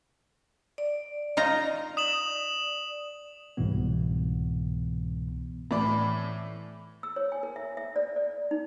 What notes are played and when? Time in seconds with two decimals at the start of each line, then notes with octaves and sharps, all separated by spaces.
0.78 D5
1.37 D#4 F4 A#5
1.97 D#6 E7 F#7
3.57 C2 G#2 B2 E3 B3
5.71 A2 E3 D5 B5
7.03 E6
7.16 C#5
7.32 G#5
7.43 A#4
7.56 E5
7.77 E5
7.96 D5
8.16 D5
8.51 D#4